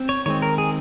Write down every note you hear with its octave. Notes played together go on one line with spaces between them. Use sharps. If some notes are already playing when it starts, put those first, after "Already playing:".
Already playing: C4
C#5
D#3 G#3 C4 C#5
A#4
G#4